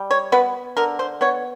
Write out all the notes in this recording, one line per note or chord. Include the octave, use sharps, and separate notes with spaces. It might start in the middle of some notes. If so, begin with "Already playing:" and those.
Already playing: G3
C#5
B3 B4
D3 A#4
C5
B3 C#5